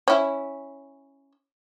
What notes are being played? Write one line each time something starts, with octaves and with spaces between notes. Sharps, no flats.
C#4 E4